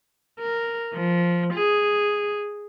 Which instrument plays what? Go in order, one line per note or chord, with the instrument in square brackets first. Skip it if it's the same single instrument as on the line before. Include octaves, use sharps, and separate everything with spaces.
[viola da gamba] A#4
F3
G#4